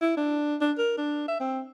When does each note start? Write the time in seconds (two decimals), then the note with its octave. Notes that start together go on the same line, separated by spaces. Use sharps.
0.01 E4
0.17 D4
0.61 D4
0.78 A#4
0.98 D4
1.28 E5
1.40 C4